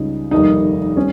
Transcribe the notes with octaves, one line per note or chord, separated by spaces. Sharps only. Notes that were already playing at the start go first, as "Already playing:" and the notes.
Already playing: C#2 C#3 G3 D#4
F1 D#2 D#3 G3 D#4
G3 C#4